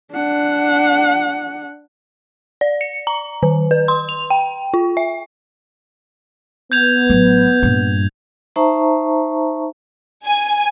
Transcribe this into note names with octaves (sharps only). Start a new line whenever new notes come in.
D4 F#5
D5
C#7
A#5
D#3
B4
C6
F7
G5
F4
E5
B3 G6 G#6 F7
A1 F#3
G2 A#2
D#4 C5 E5 A5 A#5 C#6
G#5